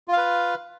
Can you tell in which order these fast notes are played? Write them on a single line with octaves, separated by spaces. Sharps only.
F4 F5 B4